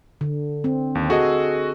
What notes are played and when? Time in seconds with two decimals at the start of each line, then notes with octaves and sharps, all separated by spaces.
0.21 D3
0.64 C4
0.95 D#2
1.10 F#4 G#4 A4 D#5